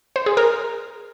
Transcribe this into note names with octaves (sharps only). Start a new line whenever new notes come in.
C5
G#4
A#4